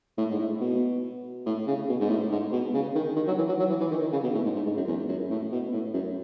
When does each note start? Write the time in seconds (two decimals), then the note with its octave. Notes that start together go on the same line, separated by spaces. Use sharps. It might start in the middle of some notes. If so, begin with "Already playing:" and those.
0.18 A2
0.31 G#2
0.39 A2
0.60 B2
1.46 A2
1.67 C#3
1.88 B2
2.00 G#2
2.09 A2
2.31 G#2
2.52 B2
2.73 C#3
2.95 D#3
3.16 D#3
3.27 F#3
3.38 E3
3.49 F#3
3.59 F#3
3.70 E3
3.81 E3
3.91 D#3
4.02 D#3
4.12 C#3
4.23 B2
4.34 A2
4.45 G#2
4.56 G#2
4.66 G#2
4.77 F#2
4.87 E2
5.09 F#2
5.30 A2
5.52 B2
5.73 A2
5.94 F#2